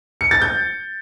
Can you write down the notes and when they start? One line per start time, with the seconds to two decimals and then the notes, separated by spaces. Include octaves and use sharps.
0.21 C#7
0.31 A6
0.42 G6